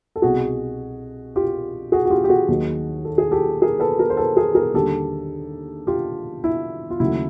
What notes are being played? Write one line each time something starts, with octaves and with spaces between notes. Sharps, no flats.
A4
C2 B2 G3 F#4 G#4
F4 G4
F#4 G#4
F#4
F4 G4
G4
F#4 G#4
D#2 D#3 F#3
A4
G#4
G4 A4
G#4 A#4
A4 B4
G#4 A#4
C5
A4 B4
G#4 A#4
G#4 A#4
D#2 D3 G3 G4 A4
F4 G4
E4
F4
D#2 C#3 F#3 A3 E4